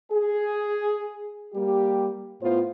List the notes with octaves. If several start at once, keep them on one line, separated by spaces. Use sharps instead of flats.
G#4
G3 A#3 G4
A2 B3 F4 C5